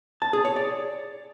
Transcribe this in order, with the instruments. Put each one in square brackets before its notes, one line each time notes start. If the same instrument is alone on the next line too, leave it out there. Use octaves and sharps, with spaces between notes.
[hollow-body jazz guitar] A5
G#4
C#5
D5